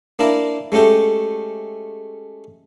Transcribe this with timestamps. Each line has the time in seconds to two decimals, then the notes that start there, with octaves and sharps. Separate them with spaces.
0.19 A#3 D4 E4 A#4 D5
0.72 G#3 A3 C#4 G4 A4